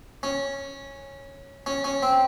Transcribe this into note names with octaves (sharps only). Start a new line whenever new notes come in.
C#4
C#4
C#4
C4